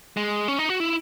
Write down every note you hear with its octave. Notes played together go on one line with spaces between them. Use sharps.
G#3
C#4
D#4
F#4
E4